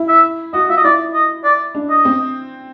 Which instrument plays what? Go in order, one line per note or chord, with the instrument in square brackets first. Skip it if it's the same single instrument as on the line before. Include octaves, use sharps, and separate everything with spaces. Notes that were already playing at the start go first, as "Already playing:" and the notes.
Already playing: [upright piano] E4
[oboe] E5
[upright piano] F#4 [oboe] D#5
[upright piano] F4 [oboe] E5
[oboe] D#5
[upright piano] E4 [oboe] D5
[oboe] D#5
D5
[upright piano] D4
[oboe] D#5
[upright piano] C4